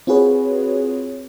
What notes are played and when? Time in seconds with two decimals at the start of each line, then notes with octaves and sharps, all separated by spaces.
0.07 C4 F4 F#4 G#4 B4 C#5